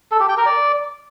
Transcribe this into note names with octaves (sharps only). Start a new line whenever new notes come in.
A4
G4
G5
A#4
D5